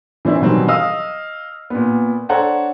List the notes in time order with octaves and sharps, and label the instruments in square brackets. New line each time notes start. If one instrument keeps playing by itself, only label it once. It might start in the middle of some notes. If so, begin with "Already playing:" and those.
[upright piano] E3 C4 C#4 E4
B2 D#3 E3 F#3 G3 C4
D#5 F5 D#6 E6
A#2 B3
D4 A4 C5 C#5 F#5 A#5